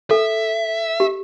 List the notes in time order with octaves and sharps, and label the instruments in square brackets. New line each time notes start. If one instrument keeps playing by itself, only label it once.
[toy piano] A4 [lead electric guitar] E5
[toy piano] G4